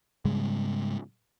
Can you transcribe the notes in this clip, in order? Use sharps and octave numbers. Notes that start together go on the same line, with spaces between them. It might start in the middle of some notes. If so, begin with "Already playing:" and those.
G#2 C#3 G3 G#3